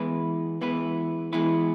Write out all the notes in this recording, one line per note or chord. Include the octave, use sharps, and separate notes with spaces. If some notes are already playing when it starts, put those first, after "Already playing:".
Already playing: E3 G#3 B3 E4 B4
E3 G#3 B3 E4 B4
E3 G#3 B3 E4 B4